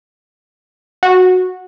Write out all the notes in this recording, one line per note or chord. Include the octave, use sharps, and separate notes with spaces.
F#4